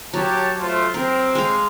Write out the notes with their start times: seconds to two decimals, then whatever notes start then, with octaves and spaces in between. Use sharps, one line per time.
0.14 F#3 G4 C#5 A5
0.59 A3 F4 C5
0.94 C4 A#4
1.35 G#3 F5